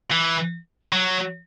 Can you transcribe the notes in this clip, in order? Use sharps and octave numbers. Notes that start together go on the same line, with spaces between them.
E3
F#3